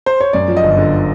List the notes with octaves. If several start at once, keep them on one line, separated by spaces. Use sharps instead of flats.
C5
C#5
F#2 D5
F3
D#5
G1
D3